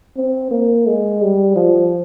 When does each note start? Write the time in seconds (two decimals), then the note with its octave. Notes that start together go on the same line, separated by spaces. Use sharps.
0.17 C4
0.51 A#3
0.87 G#3
1.22 G3
1.56 F3